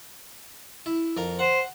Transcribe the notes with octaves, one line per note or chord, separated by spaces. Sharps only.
E4
F2 A#4
C5 F#5